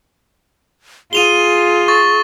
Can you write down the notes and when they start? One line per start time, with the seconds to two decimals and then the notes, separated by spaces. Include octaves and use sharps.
1.13 F4 G#4 D#7 F7 G7
1.88 C#6 A6